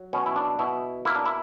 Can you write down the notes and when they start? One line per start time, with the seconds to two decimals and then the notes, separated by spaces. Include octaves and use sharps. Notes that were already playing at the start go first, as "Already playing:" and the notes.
Already playing: F#3
0.13 B2 C#4
0.26 E4
0.36 D4
0.59 B2 E4
1.05 A#3 E4
1.15 D4
1.26 E4